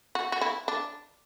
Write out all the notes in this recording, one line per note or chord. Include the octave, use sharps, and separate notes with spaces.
F#4
F#4
E4
D4